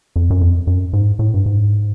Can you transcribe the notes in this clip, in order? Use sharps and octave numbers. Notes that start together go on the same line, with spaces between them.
F2
F#2
F2
F#2
G#2
A2
G2
G#2